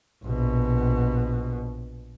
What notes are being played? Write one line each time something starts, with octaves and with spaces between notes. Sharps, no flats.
A#1 B2